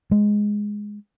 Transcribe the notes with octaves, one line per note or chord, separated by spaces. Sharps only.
G#3